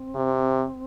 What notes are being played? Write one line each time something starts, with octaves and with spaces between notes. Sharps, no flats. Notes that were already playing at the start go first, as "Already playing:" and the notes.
Already playing: C4
C3